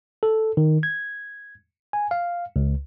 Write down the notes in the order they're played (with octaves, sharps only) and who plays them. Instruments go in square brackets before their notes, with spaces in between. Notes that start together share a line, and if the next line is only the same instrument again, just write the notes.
[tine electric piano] A4
D#3
G#6
G#5
F5
C#2